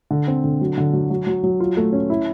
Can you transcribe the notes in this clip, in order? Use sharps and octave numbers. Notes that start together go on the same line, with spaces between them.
D3
C4
D3
F#3
D3
F#3
F#3
F#3
F#3
F4
A3
C#4
E4